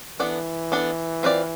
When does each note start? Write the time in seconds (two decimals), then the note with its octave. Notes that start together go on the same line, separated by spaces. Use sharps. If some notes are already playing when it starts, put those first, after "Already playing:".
0.20 E3 B3 D4 A4 D5
0.72 B3 D4 A4 D5
1.23 C4 F4 B4 D5